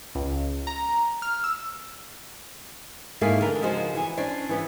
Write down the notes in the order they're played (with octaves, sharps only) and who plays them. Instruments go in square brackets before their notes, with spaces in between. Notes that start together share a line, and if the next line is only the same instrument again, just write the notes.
[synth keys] C#2
A#5
F6
E6
[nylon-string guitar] G#2 A3 A#3 E4 G#4 F5
D3 E3 A#4
C#3 F3 G#3 D#4 F#4 C5
E3 C#5 G#5
C#4 D4 C5 D5
E3 B3 E4